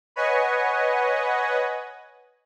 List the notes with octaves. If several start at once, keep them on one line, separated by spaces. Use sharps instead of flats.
B4 C#5 D#5 F#5 G#5